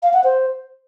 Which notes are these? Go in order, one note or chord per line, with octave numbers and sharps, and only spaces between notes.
F5
F#5
C5